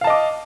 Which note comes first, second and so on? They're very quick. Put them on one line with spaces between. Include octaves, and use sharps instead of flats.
F5 A5 D#5 D6